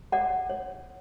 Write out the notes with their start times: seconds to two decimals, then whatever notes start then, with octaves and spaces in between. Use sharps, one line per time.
0.12 C#5 D5 F#5
0.49 C#5